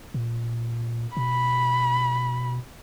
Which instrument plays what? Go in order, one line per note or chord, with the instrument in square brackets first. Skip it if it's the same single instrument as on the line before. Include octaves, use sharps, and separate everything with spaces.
[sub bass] A#2
[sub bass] B2 [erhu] B5